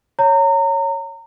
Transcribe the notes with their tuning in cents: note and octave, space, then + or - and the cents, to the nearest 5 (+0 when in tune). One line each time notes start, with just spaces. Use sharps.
C#5 +0 A#5 -30